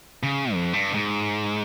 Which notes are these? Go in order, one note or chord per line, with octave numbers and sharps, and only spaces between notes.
C#3
F2
G2
G#2